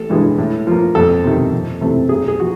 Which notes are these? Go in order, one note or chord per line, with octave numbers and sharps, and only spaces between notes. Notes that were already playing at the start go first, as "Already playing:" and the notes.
Already playing: A1 A4
G2 E3 G#3
A2
F3 A#3
F2 A4
C3 D#3
F2
C3 E3 A3 C4
B1 G#4
G#4
F3 F#4